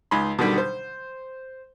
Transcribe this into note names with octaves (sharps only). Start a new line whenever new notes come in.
C#2 D#4 G#5 B5 C6
B2 D3 D#3 G3
C5